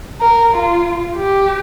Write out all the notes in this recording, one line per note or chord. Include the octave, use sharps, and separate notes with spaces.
A#4
F4
G4